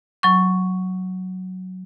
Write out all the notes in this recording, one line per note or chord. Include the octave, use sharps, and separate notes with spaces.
F#3 C#6